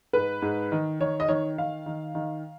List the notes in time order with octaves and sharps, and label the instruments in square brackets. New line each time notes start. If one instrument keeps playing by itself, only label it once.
[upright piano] G#2 B4
G#2
D#3
D#3 C#5
D#5
D#3 C#5
D#3 F5
D#3
D#3